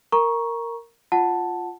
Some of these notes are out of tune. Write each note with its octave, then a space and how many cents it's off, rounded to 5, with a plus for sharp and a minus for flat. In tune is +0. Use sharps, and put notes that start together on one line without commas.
A#4 -10 A#5 +20 C#6 +0
F4 +0 F#5 +0 A5 +0